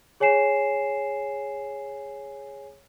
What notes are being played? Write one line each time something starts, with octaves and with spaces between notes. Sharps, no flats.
G#4 C#5 G#5 C7 E7